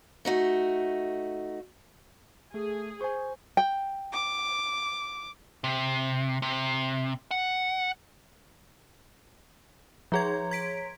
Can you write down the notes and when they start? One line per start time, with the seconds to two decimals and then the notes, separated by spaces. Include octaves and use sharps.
0.25 A3 D#4 F#4
2.54 A3 G#4
3.01 C5 G#5 C#6
3.57 G5
4.13 D6
5.64 C3
6.42 C3
7.31 F#5
10.12 F3 G#4 C#5 A#5 C6 G#6
10.51 G#6 B6 D7